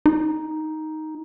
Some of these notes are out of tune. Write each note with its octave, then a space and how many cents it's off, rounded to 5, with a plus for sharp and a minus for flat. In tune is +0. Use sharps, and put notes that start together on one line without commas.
D#4 +5